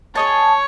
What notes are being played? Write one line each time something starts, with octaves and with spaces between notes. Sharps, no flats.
G#4 C#5 D#5 A5